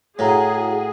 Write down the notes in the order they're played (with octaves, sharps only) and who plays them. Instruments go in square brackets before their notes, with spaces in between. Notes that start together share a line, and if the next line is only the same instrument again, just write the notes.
[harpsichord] A2 [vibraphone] E4 F#4 F#5 [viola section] G#4 [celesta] C#5 F5 A#5